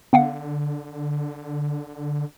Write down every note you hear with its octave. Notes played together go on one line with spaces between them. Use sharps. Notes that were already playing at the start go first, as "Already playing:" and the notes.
D3 B3 F5 F#5